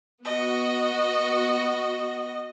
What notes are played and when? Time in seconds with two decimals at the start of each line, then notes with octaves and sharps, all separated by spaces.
0.25 B3 F#4 D#5